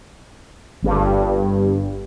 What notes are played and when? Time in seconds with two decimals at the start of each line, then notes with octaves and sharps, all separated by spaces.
0.83 G1 G2